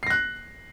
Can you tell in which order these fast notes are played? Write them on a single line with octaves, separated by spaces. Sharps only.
C7 A#6 F#6